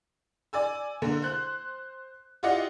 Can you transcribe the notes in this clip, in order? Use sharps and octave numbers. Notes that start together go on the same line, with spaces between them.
D5 G#5 E6
D3 A#3
C5 F#6
E4 F4 G4 D5 D#5 F#5